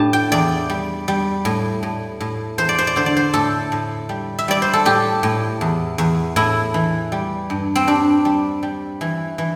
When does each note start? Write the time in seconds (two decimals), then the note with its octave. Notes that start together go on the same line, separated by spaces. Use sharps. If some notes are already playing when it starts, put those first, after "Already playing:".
Already playing: A2 D4 G4 A5
0.13 G5
0.32 E2 D5
0.70 G3
1.08 G3
1.45 A2
1.83 A2
2.20 A2
2.58 E2 C5
2.69 D5
2.78 C5
2.87 D5
2.96 D3 C5
3.06 D5
3.17 C5
3.34 A2 A4
3.72 A2
4.09 G3
4.39 E5
4.48 G3 D5
4.62 C5
4.73 A4
4.85 A2 G4
5.23 A2
5.61 E2
5.98 E2
6.36 A2 E4
6.74 E3
7.12 G3
7.50 G2
7.75 C4
7.87 G3 D4
8.25 G3
8.63 G3
9.01 E3
9.38 E3